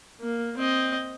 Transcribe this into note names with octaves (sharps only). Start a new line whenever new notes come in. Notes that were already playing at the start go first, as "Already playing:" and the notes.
A#3
C4 D#5